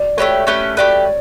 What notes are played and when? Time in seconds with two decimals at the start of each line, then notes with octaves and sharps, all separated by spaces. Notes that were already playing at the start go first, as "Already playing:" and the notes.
Already playing: D5
0.17 A3 C#4 G4 B4 C#5
0.47 A3 C#4 G4 B4
0.77 A3 C#4 G4 B4 D5